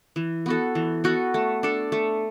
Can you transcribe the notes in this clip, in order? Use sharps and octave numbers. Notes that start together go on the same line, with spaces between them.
E3
B3 F#4 A4
E3
B3 F#4 A4
A3
D4 A4
A3